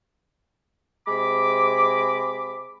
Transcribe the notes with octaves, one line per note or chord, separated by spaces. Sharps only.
C3 G#3 B5 D6